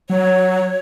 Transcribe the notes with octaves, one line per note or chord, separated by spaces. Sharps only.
F#3 C#5